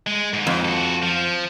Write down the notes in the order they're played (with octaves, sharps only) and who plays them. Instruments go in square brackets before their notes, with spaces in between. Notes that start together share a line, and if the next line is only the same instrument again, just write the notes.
[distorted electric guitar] G#3
D#2 G#2
[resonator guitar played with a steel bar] F2
[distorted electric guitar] F#4 A4
F3